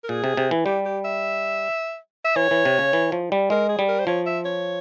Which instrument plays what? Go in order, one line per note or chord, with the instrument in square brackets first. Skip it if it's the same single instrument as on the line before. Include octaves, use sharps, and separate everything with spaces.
[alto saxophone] A#4
[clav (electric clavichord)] A#2 [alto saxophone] G#4
[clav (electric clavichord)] C3
C3
E3
[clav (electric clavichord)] G3 [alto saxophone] G4
[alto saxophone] G4
E5
E5
[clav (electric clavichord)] E3 [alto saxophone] C#5
[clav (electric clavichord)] E3
C3
C#3
E3
F3
G3
[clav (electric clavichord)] G#3 [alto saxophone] A#4
[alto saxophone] G#4
[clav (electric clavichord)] G3
[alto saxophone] A#4
C5
[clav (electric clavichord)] F3 [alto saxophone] C#5
[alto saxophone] E5
C#5